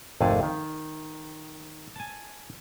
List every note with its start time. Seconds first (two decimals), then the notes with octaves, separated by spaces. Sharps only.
0.21 G#1 F2 C3 A3 G#4 A5
0.43 D#3
1.96 G#5 A5